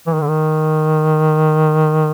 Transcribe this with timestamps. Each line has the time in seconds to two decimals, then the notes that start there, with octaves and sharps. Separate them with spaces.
0.07 E3
0.13 D#3
0.21 D3
0.28 D#3